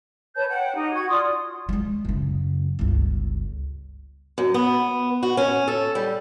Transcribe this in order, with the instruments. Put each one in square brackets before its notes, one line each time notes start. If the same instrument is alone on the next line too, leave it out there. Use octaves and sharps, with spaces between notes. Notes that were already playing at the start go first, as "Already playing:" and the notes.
[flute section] B4 C#5 A5 G6
F#5 G5
D#4 G4
F#4 G#6
F4 D5 C6 D#6
[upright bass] G3 G#3
F#2 C#3
G1 C#2
[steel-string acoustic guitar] F#2
B3
F#4
C#4
A4
G3